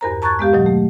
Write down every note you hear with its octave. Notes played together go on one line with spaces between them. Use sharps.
E2 G2 F#4 A#4 C5 A#5
A5 A#5 C#6 F#6 G#6 A6
G#3 B3 G4 F5
B2 D#3 F#3
A3